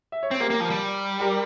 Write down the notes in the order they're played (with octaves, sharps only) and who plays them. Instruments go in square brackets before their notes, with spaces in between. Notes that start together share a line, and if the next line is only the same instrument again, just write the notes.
[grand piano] E5
C#5
[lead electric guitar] C4 [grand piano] C5
[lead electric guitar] A#3 [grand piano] G4 A#4
[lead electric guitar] A#3
F3
G3
[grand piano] G4 A#4